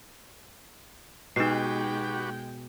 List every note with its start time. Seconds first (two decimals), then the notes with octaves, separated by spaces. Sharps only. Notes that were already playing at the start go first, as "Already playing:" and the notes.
1.36 B2 G#3 B3 D#4 F#4 G4 G5 C7